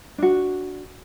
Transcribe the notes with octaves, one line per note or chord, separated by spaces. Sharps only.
D4 F#4